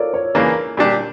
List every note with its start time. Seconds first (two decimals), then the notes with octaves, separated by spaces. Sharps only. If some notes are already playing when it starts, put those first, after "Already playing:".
Already playing: F4 A4 A#4 C#5 D5
0.14 C#5
0.35 C#3 E3 A#3 D4 A#4
0.77 A#2 G3 D4 G4